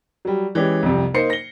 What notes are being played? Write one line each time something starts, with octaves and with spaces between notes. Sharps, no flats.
F#3 G3
E3 G#3 C#4 G4
C2 F2 C3
A#3 D#4 C5 C7 C#7
A#6 G7